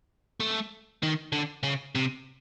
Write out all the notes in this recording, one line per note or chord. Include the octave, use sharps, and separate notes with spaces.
A3
D#3
D3
C#3
C3